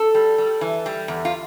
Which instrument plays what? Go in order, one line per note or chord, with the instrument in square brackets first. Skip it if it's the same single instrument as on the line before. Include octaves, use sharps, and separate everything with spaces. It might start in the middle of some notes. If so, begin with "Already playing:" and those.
Already playing: [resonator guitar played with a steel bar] A4
G3
G3
E3
G3
E2
F4